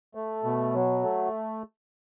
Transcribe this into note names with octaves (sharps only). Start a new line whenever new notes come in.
A3
B2
F#3
A3